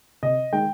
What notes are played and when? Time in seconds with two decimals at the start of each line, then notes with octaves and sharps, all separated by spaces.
0.23 C3 D#5
0.53 D#3 G#3 G5